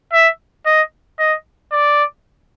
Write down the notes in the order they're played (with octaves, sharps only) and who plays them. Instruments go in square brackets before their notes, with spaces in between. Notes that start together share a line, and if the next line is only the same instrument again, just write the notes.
[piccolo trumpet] E5
D#5
D#5
D5